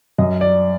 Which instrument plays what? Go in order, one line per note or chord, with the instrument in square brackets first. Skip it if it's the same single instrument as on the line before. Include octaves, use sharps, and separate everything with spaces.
[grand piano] F#2 D#5
D5